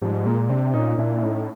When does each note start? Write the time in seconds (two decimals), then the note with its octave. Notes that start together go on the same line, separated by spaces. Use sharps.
0.02 G#2 F3 G3
0.26 A#2 G#3 A#3
0.49 C3 C4 D4
0.74 A#2 C#4 D#4
0.98 A#2 D4 E4
1.18 E4
1.22 A2 C#4 D#4